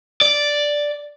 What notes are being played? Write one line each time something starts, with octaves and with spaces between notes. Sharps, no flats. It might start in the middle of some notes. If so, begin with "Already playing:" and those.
D5